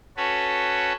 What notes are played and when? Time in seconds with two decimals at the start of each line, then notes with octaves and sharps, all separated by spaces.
0.17 C#4 F#4 A4 B4 C#5